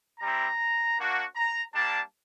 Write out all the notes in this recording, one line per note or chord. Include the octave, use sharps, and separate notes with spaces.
G3 C4 E4 A#5
A#3 D4 F#4
A#5
G3 A#3 D4 A5